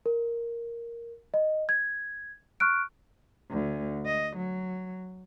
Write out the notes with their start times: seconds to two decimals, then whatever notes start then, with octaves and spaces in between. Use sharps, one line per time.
0.06 A#4
1.34 D#5
1.69 G#6
2.60 C#6 F6 F#6 D7
3.51 D2
4.06 D#5
4.37 F#3